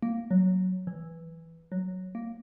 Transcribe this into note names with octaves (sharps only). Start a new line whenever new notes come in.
A#3
F#3
E3
F#3
A#3